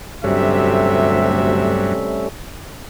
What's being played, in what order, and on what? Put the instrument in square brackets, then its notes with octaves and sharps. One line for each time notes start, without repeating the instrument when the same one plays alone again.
[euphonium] D2 [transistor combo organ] G2 F#3 [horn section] C3 E5 [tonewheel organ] G3 A3 C#4